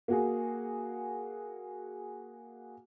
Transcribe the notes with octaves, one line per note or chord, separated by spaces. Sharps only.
A#3 F#4 G#4